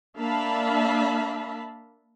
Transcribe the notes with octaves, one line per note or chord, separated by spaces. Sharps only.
A#3 D4 E5 F5 A5 B5